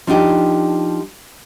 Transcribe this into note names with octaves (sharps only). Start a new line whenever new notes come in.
F3 D4 D#4 G4